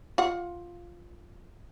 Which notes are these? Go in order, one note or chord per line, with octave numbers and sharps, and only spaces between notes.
F4 F#5